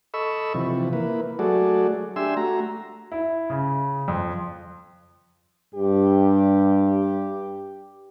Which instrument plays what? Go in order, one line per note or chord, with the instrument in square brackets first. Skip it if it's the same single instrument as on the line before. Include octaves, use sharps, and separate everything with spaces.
[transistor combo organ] A4 D#5 B5 C#6 E6
C3 E3 F3
A#3 E4 B4
F#3 A3 F#4 G#4 A4 D5
D4 G4 E5 G#5 C6 E6
A3 F#4 A#5
[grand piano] E4
C#3
F2
[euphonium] G2 [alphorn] G4